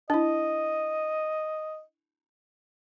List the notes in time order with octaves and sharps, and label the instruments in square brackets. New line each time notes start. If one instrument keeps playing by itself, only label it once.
[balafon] D4 E4 [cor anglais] D#5